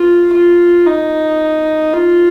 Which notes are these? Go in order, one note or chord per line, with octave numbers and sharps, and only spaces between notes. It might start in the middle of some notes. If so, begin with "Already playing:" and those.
Already playing: F4
F4
D#4
F4